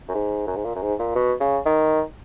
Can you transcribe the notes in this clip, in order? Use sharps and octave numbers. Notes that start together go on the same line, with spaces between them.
F#2
G#2
F#2
G#2
A#2
F#2
G#2
A#2
B2
C#3
D#3